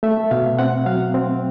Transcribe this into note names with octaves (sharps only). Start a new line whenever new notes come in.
A3 E5
B2 F5
C4 F#5
F#3 F5
C4